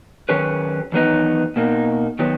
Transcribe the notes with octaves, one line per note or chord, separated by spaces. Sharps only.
D#3 F#3 C#4 G#4 B4
E2 D#3 F#3 B3 D#4
B2 A#3 D#4
D#3 F#3 B3